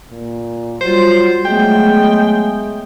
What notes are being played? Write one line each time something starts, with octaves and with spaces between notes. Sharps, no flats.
A#2
F#3 G3 F4 C5
F#3 G#3 A3 B3 G5